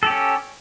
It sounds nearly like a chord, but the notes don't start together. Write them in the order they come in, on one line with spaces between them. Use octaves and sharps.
A4 G4 C#4